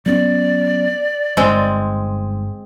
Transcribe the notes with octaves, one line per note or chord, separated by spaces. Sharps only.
F#3 B3 C#4 D5
G1 G#2 G#3 C4